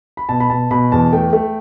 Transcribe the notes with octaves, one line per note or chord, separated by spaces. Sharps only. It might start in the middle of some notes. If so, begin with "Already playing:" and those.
B5
B2 A5
B5
B2 A5
B2 B5
E2 A5
A3 G5
A3